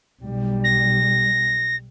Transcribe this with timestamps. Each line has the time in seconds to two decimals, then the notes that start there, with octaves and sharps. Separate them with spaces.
0.21 B1 G3
0.64 A#6